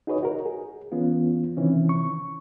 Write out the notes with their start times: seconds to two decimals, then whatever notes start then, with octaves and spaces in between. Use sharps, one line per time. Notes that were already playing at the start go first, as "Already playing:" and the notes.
0.07 D#4 F#4 G#4 B4 C#5 D#5
0.23 F#4 A#4
0.46 G#4
0.92 E3 B3 C#4 F4
1.57 C3 D#3 E3 C4 C#4
1.89 C#6